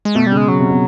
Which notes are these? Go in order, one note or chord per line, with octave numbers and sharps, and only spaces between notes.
G#3
B2 A3
C#3 G3
G#3
C#3 F#3
C3
B2